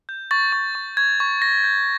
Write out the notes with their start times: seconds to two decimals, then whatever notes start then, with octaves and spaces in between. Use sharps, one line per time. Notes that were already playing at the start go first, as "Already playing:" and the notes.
0.09 G6
0.31 C#6 A6
0.52 C#6
0.75 C#6
0.97 C#6 G#6
1.20 C#6
1.42 C#6 A#6
1.64 G6